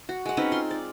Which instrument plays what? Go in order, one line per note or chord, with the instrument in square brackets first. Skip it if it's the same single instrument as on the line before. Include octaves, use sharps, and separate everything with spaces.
[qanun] F#4
G#3 F#5
C4 C#4 D#4 B4
F4 C6
D5